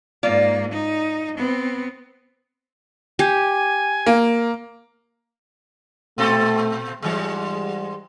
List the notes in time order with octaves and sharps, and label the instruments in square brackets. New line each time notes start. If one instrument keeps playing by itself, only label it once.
[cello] G#2 A#3 [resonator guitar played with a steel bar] F4 D5
[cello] D#4
B3 C4
[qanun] G4 [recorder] G#5
[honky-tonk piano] A#3
[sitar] A#2 C4 A4 [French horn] A3
[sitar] G#2 E3 G#3 [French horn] G3